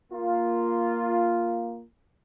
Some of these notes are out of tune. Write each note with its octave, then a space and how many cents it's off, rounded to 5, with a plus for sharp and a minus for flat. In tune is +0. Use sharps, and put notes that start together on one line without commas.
A#3 +0 F4 +0